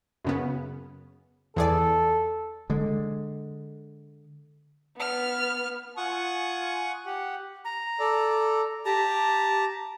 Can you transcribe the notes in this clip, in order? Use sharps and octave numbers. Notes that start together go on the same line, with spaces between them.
F#2 C#3 B3
E2 G#4 A4 D5
D3 G#3
B3 F6
F4 F#5 G#5 C#6 D#6
G4 F#5
A#5
A4 D5
G4 A5 A#5